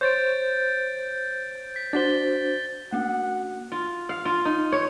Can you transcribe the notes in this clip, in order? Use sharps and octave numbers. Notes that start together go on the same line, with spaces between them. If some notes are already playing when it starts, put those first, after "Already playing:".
C5 C#5 G6 A6 D7
B6
D4 F#4 C5 A6 B6 G7
A3 A#3 F#4 F#5
F4
F5
F4
D#4
C#5